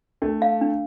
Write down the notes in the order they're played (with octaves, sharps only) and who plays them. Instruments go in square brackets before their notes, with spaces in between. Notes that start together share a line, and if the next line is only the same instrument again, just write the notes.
[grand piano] A3 [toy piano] D4
[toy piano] F5
D4